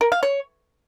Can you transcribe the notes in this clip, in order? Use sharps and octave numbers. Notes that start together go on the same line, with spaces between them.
A#4
F5
C#5